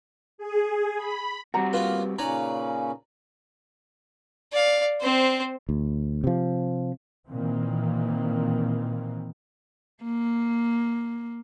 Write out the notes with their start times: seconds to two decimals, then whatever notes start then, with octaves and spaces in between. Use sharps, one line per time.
0.38 G#4
0.96 B5
1.54 G3 C4 F#4 F#5 A#5
1.73 A#3 B3 F4 B4
2.19 A#2 C#3 C#4 D#4 B4 C#5 D5 A#5
4.52 D5 F5
5.01 C4 C5
5.69 D2
6.24 C3 F3
7.29 A#2 D#3 E3 A#3 C4
10.03 A#3